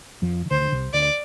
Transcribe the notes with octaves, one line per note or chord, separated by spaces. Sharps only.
F2 F3
D#3
D2 D3 C5
D3
C2 C3
D2 D3 D5